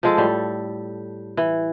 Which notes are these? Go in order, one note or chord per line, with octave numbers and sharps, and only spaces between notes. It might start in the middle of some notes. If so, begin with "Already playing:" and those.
F3 G#3 A4
A2 G3
E3